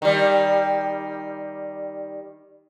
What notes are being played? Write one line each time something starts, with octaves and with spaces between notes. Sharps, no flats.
D#3 G3